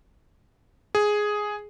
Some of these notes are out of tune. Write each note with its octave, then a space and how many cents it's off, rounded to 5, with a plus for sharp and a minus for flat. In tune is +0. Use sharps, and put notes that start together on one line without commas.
G#4 +5